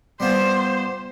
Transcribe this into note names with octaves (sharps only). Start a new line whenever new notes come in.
G3 B3 F4 C5